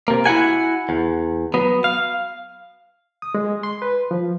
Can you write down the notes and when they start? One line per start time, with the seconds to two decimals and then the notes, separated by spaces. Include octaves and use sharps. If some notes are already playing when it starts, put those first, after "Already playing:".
0.08 C3 A#3
0.26 E4 F#4 F#5 G#5
0.89 E2
1.54 F#3 B3
1.84 F5
3.22 D#6
3.35 G#3
3.63 C6
3.82 B4
4.11 F3